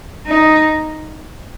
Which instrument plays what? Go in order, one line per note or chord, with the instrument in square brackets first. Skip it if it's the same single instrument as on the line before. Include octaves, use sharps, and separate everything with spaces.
[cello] D#4